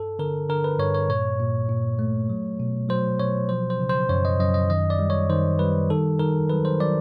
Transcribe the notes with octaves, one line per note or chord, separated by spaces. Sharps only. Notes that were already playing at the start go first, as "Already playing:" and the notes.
Already playing: G2 A4
D3 A#4
D3 A#4
B4
G2 C#5
C#5
A#2 C#5
A#2
A#2
A3
F#3
B2
F#3 C5
B2 C#5
F3 C5
C5
C#3
C5
F#2 C#5
D#5
F#2 D#5
D#5
D#3 D#5
D5
G3
C#5
D#3 C5
G3 B4
D#3 A4
D#3 A#4
F#3 B4
C5
F#3 D5